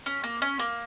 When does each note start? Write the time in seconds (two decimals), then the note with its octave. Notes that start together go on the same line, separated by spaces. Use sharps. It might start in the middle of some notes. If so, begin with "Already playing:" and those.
0.06 C#4
0.24 A#3
0.42 C#4
0.59 A#3